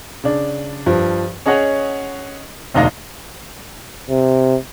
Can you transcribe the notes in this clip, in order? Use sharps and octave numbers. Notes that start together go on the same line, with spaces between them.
C#3 D4
G2 F3
C#4 G#4 C#5 D#5 F#5
E1 D2 D#4 D5 F5 A#6
C3